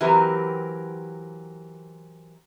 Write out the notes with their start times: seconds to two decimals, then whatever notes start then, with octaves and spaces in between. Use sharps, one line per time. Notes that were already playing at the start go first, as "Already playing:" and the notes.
0.01 E3 F#3 C4 G4 A#4 B4